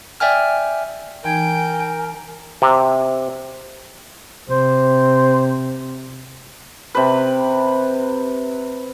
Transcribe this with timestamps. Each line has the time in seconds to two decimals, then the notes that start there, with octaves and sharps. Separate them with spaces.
0.20 D5 E5 G5 G#5 F6
1.24 E3 D#4 A#4 G5 G#5 G#6
2.62 C3
4.49 C3 C5
6.95 C3 B4